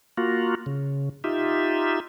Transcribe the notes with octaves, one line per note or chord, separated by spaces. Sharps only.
A#3 F4 F#4
C#3
D#4 F4 G4 E5